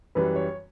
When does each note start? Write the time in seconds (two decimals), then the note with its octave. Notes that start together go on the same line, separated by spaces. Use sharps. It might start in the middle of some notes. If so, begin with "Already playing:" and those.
0.15 F#2 E3 G3 B4
0.36 C#5